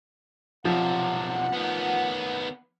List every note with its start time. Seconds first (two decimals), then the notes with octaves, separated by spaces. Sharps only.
0.65 B1 C3 F3 F#5
1.53 D#3 B3